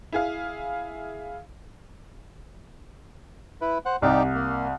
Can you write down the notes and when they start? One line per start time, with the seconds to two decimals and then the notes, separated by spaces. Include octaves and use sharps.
0.13 E4 G#4 F5
3.61 E4 B4
3.86 C5 F#5
4.02 C2 D#4 G4 D5
4.35 A#3